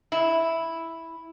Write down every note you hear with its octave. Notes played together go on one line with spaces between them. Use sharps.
E4